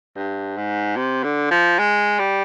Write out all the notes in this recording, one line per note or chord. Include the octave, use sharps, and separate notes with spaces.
G2
G#2
C3
D3
F3
G#3
G3